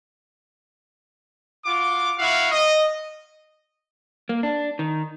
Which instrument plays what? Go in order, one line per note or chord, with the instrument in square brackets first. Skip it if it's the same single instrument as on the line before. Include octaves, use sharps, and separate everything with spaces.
[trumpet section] F4 F#4 D6
E4 F#4 F5
D#5
[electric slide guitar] A#3
D4
D#3